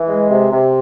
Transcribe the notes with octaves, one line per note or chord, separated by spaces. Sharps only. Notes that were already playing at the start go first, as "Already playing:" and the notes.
Already playing: E3
G#3
C3
C3